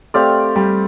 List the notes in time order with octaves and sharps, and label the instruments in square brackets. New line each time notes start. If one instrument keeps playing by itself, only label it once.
[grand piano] A3 [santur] C4 G4 D5 F5
[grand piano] G3